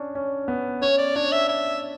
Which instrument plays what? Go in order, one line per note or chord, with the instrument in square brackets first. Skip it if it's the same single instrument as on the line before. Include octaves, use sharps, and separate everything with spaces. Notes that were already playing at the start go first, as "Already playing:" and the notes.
Already playing: [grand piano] C#4 D4
C#4
B3
[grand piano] C#4 [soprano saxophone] C#5
[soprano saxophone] D5
[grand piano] D4 [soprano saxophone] C#5
[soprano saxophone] E5
E5